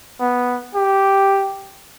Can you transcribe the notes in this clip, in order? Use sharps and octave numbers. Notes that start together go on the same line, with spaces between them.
B3
G4